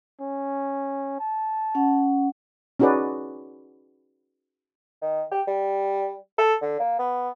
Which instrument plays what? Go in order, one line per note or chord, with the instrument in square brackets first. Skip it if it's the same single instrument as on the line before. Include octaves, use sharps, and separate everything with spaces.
[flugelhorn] C#4
A5
[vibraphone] C#4 F#5
[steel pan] C#4 D#4 F#4 G#4 B4 D5
[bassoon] D#3
G4
G3
A4
D3
A#3
B3